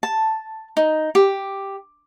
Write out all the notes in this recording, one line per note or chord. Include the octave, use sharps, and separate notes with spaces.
A5
D#4
G4